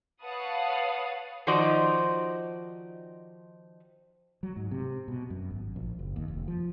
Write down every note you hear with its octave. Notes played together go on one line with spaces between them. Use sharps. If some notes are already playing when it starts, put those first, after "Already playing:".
B4 C#5 F5 F#5 A5 D#6
D#3 F3 D#4 F#4 C5 D5
F#3
G#2
C3
B2
F#2
G#1
A#1
F#1
D#2
F1
F3